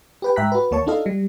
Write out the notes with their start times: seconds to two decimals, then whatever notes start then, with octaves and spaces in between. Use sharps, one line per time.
0.22 G4 B4 G5
0.36 G#2 E5 G5 A#5 F#6 B6
0.52 F#4 B4
0.71 D#2 A#3 C#5 A5 C#6
0.87 D4 D#4 F4 A4 D#5 F5
1.06 G3